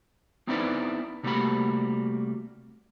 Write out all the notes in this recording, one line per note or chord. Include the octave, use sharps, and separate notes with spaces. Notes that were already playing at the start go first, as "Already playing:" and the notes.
B3 C4 D#4 E4 B4 D5
C3 G3 A3 A#3 F#4 B5